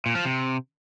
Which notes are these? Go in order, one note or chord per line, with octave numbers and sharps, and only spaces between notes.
A#2
F3
C3